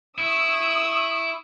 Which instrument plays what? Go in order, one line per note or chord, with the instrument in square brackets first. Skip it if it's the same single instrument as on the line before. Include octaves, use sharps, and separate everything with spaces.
[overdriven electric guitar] E4 [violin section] C#6 D#6 E6